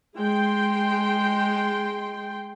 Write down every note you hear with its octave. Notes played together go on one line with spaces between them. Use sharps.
G#3 G5 C6